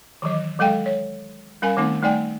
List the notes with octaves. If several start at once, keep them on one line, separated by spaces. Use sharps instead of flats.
D#3 E3 F#3 D#5
F#3 G#3 A4 F5 G5
C#5
G3 C#4 A#4 F5 G#5
D#3 A3 B3 C4 D#4
G3 A3 D#4 D5 G5 G#5